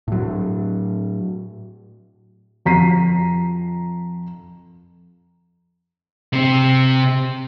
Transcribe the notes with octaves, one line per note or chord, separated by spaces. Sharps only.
A2 F#3
F2 A#5 B6 C7 D#7
C3 C4